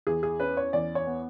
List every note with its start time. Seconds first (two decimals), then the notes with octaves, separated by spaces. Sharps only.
0.07 E2 G#4
0.23 G#4
0.40 C#4 B4
0.57 C#5
0.73 E2 D5
0.95 C#5
1.07 B3